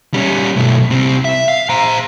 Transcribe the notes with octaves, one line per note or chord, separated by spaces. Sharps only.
G3 C#4
B1 A3
C2 C4
E5
F5
C5 A#5